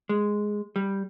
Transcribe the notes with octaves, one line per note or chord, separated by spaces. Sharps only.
G#3
G3